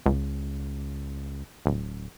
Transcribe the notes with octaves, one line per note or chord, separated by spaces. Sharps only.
C#2
D1